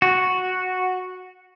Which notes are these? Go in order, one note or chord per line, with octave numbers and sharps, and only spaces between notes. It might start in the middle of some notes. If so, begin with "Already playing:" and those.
F#4